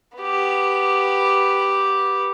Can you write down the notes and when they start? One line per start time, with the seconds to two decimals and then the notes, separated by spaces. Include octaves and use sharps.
0.17 B3 G4